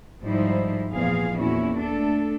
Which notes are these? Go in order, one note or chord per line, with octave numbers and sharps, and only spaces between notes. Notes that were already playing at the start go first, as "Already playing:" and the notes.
G#2 F3 G3 D#4 E4 C5
E2 A#2 F3 G#4 F5
E2 A#2 C#4 E4 F#4
A3 D4 A4